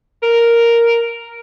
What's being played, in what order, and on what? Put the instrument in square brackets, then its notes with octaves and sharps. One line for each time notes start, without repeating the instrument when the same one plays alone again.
[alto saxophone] A#4